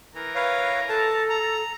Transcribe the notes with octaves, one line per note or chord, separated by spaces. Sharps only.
E3 A#4 A#5
B4 C#5 F5
A4 A5
A#5